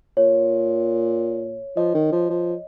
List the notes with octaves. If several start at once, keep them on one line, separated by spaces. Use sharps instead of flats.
A#2 C#5
F3 D#5
D#3
F3
F3